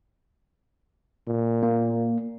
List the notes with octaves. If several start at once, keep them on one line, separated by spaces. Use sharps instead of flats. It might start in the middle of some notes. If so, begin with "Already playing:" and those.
A#2
A#3